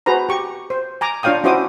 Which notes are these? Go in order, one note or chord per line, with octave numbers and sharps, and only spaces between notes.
F#4 G#4 B4 C5 A#5
G4 C#6
C5
G#5 A#5 D6
D4 F4 C#5 F5 G5 D#6
C#4 E4 F#4 C5 D6 D#6